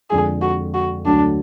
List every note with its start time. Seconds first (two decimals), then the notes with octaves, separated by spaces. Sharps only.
0.10 F2 D3 F3 G#3 G#4
0.42 F#4
0.74 F#4
1.05 D2 D3 F#3 D4